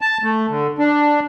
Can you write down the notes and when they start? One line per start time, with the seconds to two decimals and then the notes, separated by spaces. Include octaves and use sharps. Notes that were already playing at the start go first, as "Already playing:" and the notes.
0.01 A5
0.23 A3
0.50 D3
0.78 D4